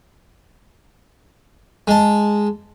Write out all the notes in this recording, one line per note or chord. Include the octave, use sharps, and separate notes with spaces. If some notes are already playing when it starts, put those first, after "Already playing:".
G#3 A5